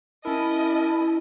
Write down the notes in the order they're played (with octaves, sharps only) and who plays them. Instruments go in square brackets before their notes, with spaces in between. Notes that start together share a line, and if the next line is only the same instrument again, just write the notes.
[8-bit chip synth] C#4 A#4 [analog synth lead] E4 [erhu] D#5 [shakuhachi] A5